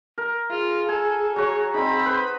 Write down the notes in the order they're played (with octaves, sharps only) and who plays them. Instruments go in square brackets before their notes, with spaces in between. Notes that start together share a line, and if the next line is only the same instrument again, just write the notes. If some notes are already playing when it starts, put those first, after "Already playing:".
[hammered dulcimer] A#4
[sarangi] F4 [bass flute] G#4
[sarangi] A4 [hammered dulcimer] G#5
[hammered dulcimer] F#3 F#4 [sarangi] C#5
[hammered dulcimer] C4 D#4 [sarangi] B5
[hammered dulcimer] B4 C5